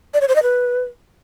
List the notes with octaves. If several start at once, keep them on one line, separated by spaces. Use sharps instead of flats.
D5
C#5
C5
D#5
B4